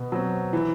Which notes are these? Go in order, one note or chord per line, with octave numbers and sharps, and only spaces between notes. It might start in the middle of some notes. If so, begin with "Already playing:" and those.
Already playing: B2
F#3 C4
E3